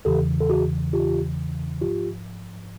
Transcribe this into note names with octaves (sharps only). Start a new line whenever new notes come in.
E2 C#3 E3 G4 A4
A4
F#4 G#4
F4 G4
G#2 F3 F4 G4